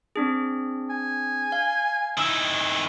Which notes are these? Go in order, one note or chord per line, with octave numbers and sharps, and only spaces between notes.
C4 D4 G#4
G#5
F5
D#3 E4 D#6 E6